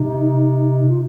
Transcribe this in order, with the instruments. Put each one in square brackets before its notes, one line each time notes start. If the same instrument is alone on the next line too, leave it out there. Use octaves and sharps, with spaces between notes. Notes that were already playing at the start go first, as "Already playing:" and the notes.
Already playing: [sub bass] C3 [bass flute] D#4
[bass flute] F4